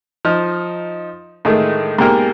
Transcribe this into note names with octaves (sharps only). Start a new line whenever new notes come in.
F3 D#4 F6
A2 D3 D#3 G#3 A3
G#2 B2 A#3 G4 A#4 F6